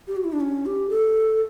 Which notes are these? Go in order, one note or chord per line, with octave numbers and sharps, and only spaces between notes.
G4
F#4
E4
D4
C#4
G4
A4